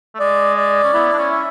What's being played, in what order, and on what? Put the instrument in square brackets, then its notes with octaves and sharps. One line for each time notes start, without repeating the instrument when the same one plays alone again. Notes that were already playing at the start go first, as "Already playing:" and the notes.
[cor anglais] A3
[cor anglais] G#3 [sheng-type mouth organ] D5
[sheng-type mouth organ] D5
[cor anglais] C#4
[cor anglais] B3 [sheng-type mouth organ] E4
[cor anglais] D4
C#4
[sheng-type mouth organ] E5